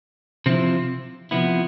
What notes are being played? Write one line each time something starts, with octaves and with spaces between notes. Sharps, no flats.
C3 F3 C4 E4
C3 F3 B3 E4